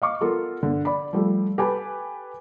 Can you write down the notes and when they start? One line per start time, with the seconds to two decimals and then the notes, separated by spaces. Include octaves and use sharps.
0.02 D#5 F5 C#6 D6
0.21 B3 F4 A4 A#4
0.63 G1 D3
0.85 D5 B5
1.13 F3 G3 A3
1.58 G4 A4 B4 G#5 A5 B5